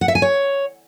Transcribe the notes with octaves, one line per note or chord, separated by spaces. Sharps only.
F#5
E5
G#5
C#5